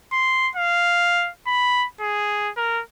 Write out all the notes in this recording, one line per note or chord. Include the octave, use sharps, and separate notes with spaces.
C6
F5
B5
G#4
A#4